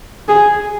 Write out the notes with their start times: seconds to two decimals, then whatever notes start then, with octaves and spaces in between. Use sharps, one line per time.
0.28 G#4